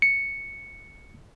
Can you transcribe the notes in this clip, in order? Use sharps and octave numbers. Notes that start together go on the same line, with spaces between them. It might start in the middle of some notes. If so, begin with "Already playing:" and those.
C#7